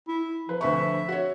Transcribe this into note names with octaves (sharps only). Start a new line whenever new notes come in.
E4
F3 B4
D2 B4 E5 C#6
F#4 C#5